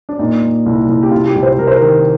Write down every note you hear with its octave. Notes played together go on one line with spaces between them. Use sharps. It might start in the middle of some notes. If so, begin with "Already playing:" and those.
D4
A#2 D#4
A#2
C2
C2
G4
C3 F4
G4
C2
C5
C2 A#4
C5
A#4
D#3